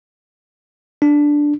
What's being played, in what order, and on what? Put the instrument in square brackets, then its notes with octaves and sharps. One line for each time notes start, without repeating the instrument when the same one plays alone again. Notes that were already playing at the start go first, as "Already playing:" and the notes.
[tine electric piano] D4